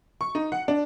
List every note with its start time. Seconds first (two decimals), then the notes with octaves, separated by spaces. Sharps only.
0.21 C#6
0.35 D#4
0.52 F#5
0.68 D4